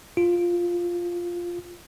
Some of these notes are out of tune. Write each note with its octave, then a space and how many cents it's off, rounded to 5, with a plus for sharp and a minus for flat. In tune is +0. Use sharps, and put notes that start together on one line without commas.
F4 +0